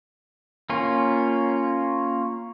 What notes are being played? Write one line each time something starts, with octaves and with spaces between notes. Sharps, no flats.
A#3 C#4 F4